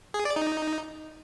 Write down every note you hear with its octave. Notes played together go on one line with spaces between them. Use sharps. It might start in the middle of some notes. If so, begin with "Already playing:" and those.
G#4
D5
D#4